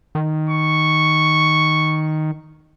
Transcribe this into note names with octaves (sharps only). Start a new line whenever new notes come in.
D#3
C#6